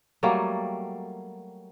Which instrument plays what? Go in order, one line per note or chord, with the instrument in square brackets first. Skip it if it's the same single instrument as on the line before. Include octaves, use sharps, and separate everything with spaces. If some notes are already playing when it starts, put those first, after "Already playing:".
[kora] F#3 G3 A3 A#3